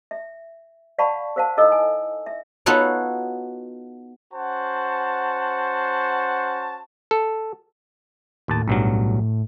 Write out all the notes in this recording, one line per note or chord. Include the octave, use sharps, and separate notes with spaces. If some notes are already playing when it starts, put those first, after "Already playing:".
E5
D5 F5 F#5 A5 B5 C#6
A#4 C5 F5 F#5 A5
D#4 E4 A4 D#5 E6
G#5
E5
B3 D#4 F4 F#4 A4 C#5
C#4 F#4 C5 F#5 A5
A4
D#2 A2 A5
B1 G2 F#3